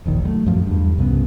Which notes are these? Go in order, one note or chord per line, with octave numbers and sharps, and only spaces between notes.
E1 A#1 D#3
F#3 G3 A3
F#2 A2 F3
E2 G2
C2 G2 C#3 B3